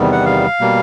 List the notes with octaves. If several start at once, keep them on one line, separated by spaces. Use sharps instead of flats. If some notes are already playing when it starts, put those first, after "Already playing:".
Already playing: E2 C3 D#3 G3 B3
F#5
F5
B2 G3 A#3